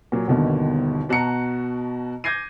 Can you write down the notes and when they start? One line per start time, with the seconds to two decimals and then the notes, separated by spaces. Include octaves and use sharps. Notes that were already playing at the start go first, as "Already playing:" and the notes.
0.12 A#2 F#3
0.27 G1 D#2 B2 D3 D#3
1.09 B2 F#4 A5 A#5 C#7
2.24 D6 G6 G#6 A#6 C7 D#7